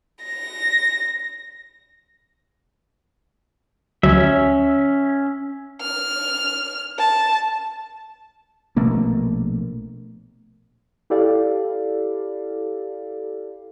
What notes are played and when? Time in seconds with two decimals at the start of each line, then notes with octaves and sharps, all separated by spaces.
0.24 A#6
4.03 D2 F#3 C#4 E5
5.81 F6
6.99 A5
8.76 A#1 B2 A3 A#3
11.10 E4 G4 A4 D5 F5